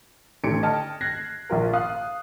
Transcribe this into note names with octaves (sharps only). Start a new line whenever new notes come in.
A1 D3 A3 G#6 C#7 D7
D#5 G5 A5 F6
F#6 G#6 A#6 C7
A#1 F4 A#4
F5 D#6 F#6